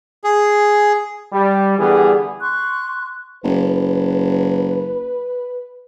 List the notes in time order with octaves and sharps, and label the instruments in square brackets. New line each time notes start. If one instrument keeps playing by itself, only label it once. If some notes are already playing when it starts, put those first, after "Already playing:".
[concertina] G#4
[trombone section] G3
D3 E3 G3 B3 G#4
[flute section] C6 C#6 F#6
[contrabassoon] F#1 [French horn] B4